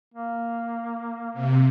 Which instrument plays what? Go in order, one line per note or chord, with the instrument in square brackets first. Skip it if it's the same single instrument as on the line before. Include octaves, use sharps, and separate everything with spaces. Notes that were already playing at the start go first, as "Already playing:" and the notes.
[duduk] A#3
[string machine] C3